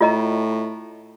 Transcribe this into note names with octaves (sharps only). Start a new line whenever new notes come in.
A2 F4 D#5 A#5